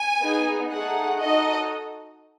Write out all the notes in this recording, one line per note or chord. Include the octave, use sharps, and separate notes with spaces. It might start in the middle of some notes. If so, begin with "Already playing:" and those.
Already playing: G#5
B3 D#4 G#4
A3 D#4 G#4 F#5
D#4 F#4 A4 D#5